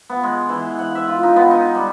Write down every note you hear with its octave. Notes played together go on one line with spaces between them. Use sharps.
B3
G#3
E3
F#5
E5
F4
D#4
B3
D#4
G3